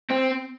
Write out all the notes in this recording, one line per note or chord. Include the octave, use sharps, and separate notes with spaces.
C4